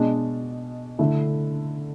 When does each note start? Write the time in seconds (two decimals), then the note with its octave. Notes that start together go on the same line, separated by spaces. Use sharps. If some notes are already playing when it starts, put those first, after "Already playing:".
Already playing: B2 G#3 D4
0.99 D3 A3 E4